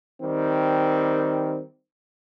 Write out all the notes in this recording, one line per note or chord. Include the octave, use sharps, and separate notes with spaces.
D#3 G3 C4